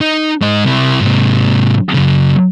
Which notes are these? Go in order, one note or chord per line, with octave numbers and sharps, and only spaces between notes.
D#4
G#2 D#5
C3 E4
G#2 C3
F#2 C#3